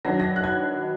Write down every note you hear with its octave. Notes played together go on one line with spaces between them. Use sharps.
D#3 F#3 D4 A#6
A#6
F#6
G#6